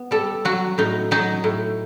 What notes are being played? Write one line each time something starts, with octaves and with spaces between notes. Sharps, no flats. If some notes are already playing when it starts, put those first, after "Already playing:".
Already playing: B3
G3 A4
F#3 F#4
A2 D#4
F#3 D#4
A2